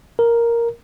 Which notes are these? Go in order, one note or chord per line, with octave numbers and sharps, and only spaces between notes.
A#4